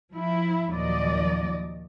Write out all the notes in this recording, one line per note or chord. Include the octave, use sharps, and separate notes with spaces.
F3 E4
D#2 A#2 F3 F#3 D5 D#5